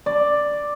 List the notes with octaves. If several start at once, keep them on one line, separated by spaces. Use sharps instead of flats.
D5